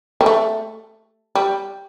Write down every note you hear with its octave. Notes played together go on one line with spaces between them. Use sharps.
G3
A3
G3